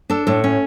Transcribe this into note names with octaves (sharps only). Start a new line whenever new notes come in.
D4 A4
A2 A4
C#4